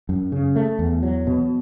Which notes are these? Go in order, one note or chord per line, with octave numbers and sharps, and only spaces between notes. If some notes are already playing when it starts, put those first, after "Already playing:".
F#2
C#3
A3
E2
F#3
B2